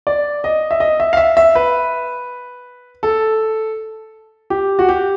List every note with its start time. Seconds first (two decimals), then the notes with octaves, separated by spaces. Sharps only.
0.07 D5
0.44 D#5
0.71 E5
0.80 D#5
1.00 E5
1.13 F5
1.17 E5
1.37 E5
1.55 B4
3.03 A4
4.50 G4
4.79 F#4
4.89 G4